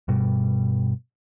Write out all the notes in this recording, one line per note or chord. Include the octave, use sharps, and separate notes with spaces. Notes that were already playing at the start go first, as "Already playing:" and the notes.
G2 B2 G3